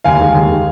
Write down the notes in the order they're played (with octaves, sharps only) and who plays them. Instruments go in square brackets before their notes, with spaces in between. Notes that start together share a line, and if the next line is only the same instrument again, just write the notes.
[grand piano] D#2 F5 G#5
D#3 G#3
D#2
D#3 G#3